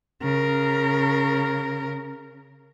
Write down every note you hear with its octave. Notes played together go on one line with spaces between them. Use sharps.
C#3 A#4